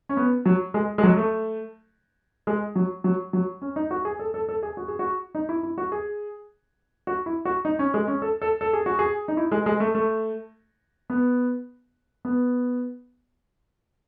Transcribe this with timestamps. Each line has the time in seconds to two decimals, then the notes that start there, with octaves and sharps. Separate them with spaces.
0.09 C#4
0.17 B3
0.46 F#3
0.74 G#3
0.98 G#3
1.03 F#3
1.17 A3
2.47 G#3
2.76 F#3
3.04 F#3
3.33 F#3
3.62 C#4
3.76 D#4
3.91 F#4
4.05 G#4
4.19 A4
4.34 A4
4.49 A4
4.63 G#4
4.77 F#4
4.88 G#4
4.99 F#4
5.35 D#4
5.49 E4
5.63 E4
5.78 F#4
5.92 G#4
7.07 F#4
7.26 E4
7.45 F#4
7.65 D#4
7.79 C#4
7.94 G#3
8.08 C#4
8.22 A4
8.42 A4
8.61 A4
8.73 G#4
8.86 F#4
8.99 G#4
9.28 D#4
9.37 E4
9.52 G#3
9.66 G#3
9.80 A3
9.95 A3
11.10 B3
12.25 B3